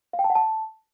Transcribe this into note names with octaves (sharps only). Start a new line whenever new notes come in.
F5
G5
A5
F#5
A5